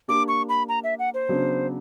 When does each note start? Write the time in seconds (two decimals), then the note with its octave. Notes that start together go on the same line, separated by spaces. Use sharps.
0.08 A#3 D4 G4 D6
0.28 C#6
0.49 B5
0.69 A#5
0.84 E5
0.99 F#5
1.14 C5
1.29 C#3 F#3 B3 D4